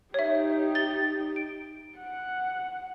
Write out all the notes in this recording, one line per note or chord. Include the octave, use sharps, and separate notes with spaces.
D#4 G4 C#5 E5
A6 G7
D7
F#5